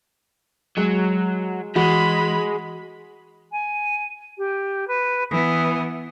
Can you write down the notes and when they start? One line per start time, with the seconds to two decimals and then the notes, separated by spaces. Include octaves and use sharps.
0.77 F#3 G#3
1.76 E3 G#3 F#4 B5
3.51 G#5
4.37 G4
4.87 B4
5.30 E3 B3 D#6